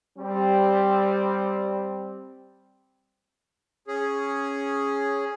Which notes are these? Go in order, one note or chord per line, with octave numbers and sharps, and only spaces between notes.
G3 C4
C#4 G#4